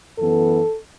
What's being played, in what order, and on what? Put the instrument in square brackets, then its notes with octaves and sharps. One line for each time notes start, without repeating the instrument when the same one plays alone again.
[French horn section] F#2 E3 B3 A4